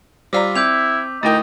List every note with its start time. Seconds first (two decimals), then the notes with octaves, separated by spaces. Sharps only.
0.33 G3 F4 C5 D5 A#5 D6 E6 B6
0.55 C4 E4 D6 G6 F7
1.23 D2 A3 D#4 E4 A#4 G5